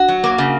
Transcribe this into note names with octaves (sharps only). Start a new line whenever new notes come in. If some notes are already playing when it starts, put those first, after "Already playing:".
Already playing: F#4
F#3
A#3
C#3